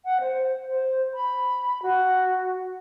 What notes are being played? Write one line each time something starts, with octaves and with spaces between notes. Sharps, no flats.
F#5
C5
C5
B5
F#4